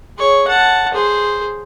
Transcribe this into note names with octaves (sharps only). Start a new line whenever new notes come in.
G#4 C#5
F#5 A5
G#4 C5